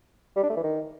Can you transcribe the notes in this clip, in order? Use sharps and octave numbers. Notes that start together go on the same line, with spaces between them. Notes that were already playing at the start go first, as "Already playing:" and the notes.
G3
D4
A3
E3
D#3